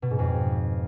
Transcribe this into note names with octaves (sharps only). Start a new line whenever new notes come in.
B2
G#2
F2